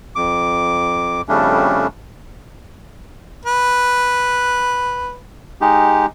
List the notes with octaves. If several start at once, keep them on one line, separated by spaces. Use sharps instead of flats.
F2 D6
F2 C#3 G3 A3 C#4 D4
B4
G#3 D#4 G4